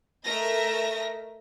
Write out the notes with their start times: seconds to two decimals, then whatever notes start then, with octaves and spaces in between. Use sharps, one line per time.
0.25 A3 A#4 D#5 E5 A#6